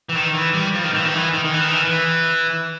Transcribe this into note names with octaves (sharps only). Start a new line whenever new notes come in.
E3
D#3
E3
G3
F3
D#3
E3
D#3
E3
D#3
D#3
E3
D#3
E3
E3